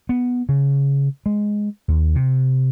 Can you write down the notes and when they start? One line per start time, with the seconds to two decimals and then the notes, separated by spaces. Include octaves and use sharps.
0.09 B3
0.49 C#3
1.26 G#3
1.88 D#2
2.15 C3